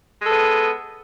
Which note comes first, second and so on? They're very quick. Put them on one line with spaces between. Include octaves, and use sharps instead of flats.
G#3 A4 B3